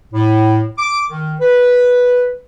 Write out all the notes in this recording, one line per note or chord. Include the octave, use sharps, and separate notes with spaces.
A2
D6
D#3
B4